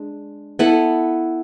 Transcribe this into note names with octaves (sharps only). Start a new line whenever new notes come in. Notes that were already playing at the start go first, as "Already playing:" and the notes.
Already playing: G#3 D4
B3 E4 A4